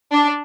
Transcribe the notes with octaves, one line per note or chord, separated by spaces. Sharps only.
D4